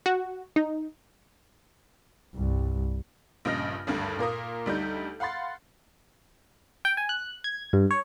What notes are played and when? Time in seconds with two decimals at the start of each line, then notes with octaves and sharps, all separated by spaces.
0.06 F#4
0.56 D#4
2.35 C2 G2
3.45 A#1 G2 C#3 D#5 F6 A#6
3.87 G#1 D2 G2
4.19 A#2 A#3 A#4 D#6
4.66 D2 G3 D#4 G6
5.20 F5 F#5 B5 C6 A6
6.85 G5
6.97 G#5
7.09 F#6
7.44 G#6
7.73 G2
7.91 C#5